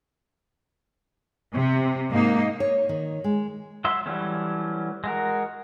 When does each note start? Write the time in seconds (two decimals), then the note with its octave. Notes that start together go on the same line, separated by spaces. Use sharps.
1.53 C3
2.11 G#2 A#3 D#4
2.60 C#5
2.89 D#3
3.24 G#3
3.85 F#3 E5 C6
4.06 E3 F#3 G3 A3 C#4
5.04 G#3 F#4 A#4